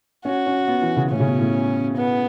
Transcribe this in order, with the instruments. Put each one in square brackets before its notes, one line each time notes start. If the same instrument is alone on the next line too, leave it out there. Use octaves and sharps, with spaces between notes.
[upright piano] C#4 [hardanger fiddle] F#4
[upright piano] C#4
B3
E3
C#3
[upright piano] A2 [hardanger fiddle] C#4
[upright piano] C#3
B2
A2
[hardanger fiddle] B3